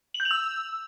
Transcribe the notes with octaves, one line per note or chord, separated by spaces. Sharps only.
F#7
G6
F7
E6